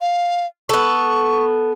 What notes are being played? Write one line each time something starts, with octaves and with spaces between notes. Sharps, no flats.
F5
B3 A4 C#6